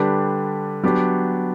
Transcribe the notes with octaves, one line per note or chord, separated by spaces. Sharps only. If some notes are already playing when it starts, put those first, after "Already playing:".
Already playing: D3 G3 D4 G4 B4
F#3 B3 D4 G4